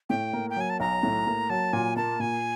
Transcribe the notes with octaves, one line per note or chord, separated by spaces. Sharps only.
A2 G5
A#3
G5
F#3 G#5
A5
B1 A#5
A2
A#3
F#3 A5
A#2 G#5
A#3 A5
A#2 G#5